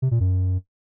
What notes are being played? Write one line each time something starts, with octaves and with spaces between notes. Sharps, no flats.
C3
A#2
F#2